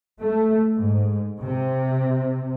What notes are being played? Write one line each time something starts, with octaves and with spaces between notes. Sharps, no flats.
A3
G#2
C3